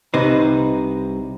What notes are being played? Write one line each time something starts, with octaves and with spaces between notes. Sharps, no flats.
C2 C3 D#4 B4 C5